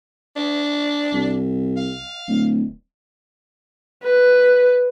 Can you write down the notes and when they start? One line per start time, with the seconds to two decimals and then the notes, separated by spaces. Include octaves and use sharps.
0.36 D4
1.13 C2
1.77 F5
2.28 D1
4.03 B4